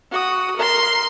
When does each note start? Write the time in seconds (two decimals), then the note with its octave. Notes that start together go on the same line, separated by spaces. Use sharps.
0.11 F#4 D#6
0.57 A#4 C6